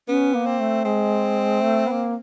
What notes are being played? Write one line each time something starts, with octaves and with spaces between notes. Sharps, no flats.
B3 C#4
A#3
C4
A3
G#3 C4
A3
B3
A#3